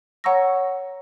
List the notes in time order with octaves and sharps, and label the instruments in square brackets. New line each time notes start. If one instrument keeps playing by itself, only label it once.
[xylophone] C#5 F#5 A#5 C#6 E6 A#6